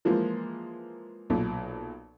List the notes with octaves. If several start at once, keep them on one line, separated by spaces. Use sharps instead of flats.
E3 F3 G#3 A#3 F4
B1 A#2